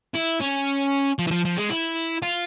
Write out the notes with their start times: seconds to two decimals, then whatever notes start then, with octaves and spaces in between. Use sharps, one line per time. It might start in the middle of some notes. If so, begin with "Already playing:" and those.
0.14 E4
0.40 C#4
1.19 F3
1.27 E3
1.31 F3
1.45 F3
1.57 G#3
1.70 E4
2.22 F4